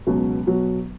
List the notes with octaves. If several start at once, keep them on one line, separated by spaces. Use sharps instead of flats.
C#2 B2 F#3
B2 F#3